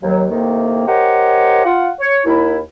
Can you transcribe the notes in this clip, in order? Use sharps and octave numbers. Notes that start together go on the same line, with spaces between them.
D#2 F#3
A2 C3 D#3 A#3
G4 A#4 C5 C#5 D#5 F#5
F4 F#5
C#5
D#2 E4